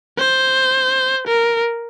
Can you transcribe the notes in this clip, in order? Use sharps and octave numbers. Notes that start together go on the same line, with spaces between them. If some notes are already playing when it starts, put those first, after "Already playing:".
C5
A#4